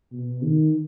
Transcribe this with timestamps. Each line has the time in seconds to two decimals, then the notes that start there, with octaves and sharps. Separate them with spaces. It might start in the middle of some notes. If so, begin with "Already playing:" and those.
0.12 B2
0.43 D#3